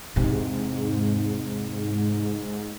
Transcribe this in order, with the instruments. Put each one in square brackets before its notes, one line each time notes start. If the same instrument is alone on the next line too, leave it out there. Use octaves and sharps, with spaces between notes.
[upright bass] E2 C3 [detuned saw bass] G#2